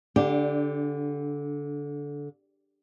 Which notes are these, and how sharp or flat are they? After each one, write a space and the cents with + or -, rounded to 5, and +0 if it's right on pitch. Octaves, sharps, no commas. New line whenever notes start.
D3 -20 D4 +5 G4 +0